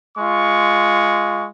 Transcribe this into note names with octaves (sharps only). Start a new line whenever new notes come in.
G#3 F4 C#6